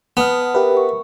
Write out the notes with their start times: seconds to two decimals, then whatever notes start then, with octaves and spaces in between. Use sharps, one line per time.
0.17 B3 A5 D#6 F6
0.42 F#5
0.55 G4 A#4 B4 E5
0.77 C#6